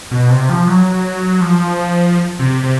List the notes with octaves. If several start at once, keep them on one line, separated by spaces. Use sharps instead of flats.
B2
C3
F3
F#3
F3
C3
C3